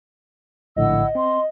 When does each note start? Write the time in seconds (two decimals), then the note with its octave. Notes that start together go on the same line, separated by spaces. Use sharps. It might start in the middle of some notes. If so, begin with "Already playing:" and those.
0.76 A#1 A2 D3 E4 D#5 F#5 E6
1.15 C4 C6